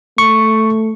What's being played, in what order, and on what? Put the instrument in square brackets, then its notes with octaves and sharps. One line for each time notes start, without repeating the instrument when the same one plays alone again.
[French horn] A3 [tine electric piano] C#6